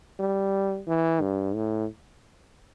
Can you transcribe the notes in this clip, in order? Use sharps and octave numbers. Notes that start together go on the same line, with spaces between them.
G3
E3
G2
A2